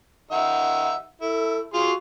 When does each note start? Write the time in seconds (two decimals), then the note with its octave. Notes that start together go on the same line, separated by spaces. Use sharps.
0.31 D#3 D#4 E5 F#5
1.21 E4 A4
1.74 F4 F#4 G#4 C6